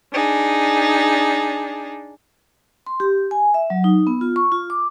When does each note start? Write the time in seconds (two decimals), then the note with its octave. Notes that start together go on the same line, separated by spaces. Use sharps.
0.11 D4 D#4 G#4
2.87 C6
3.00 G4
3.31 G#5
3.54 E5
3.70 F#3
3.84 D#4
4.07 B3
4.21 F4
4.36 C#6
4.52 F4
4.70 D6